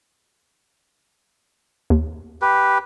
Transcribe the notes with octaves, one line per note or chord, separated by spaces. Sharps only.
D#2
G4 B4